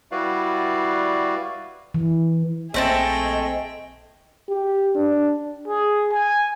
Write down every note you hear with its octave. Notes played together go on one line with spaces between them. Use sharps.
G3 E4 F#4 B4 D5 F5
E3
A#1 A3 C4 G#4 D#5 G5 A5 A#6
G4
D4
G#4
G#5